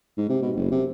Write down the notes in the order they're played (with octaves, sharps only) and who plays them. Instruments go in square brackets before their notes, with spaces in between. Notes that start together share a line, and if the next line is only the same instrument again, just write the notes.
[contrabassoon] G#2
C3
B2
F#1
C3